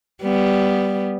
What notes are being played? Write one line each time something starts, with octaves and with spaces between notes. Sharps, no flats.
G3 B3